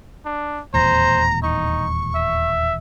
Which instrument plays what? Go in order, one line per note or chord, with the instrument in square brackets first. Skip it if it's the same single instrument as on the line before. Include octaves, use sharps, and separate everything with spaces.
[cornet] D4
[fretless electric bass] D#1 E2 A2 [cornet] C5 [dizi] A#5
[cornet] D#4 [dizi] C#6
[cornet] E5